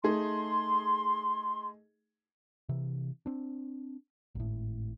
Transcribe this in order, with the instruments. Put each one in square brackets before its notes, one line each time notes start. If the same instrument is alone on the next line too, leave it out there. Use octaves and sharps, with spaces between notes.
[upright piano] A3 D#4 G#4 [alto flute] C6
[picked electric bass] C3 E3
C4 D4
G#1 A2